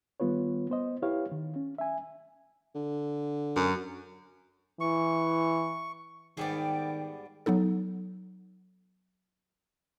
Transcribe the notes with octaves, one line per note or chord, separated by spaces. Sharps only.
D#3 G3 B3 F4 B4 C#5
B3 C5 D#5
E4 G4 B4 C#5 F5
D#3
C#4
E5 G#5
D3
F#2
E3 C#6
G#2 D#3 G3 B3 G#4 D5 G5
F#3 B3 D#4 A4